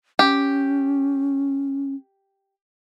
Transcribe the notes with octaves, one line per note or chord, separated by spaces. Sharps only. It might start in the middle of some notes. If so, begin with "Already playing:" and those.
C#4 G4